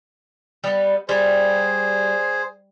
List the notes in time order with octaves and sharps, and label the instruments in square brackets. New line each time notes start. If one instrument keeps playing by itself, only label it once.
[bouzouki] G3 B3
[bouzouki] G3 [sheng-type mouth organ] G#4 C5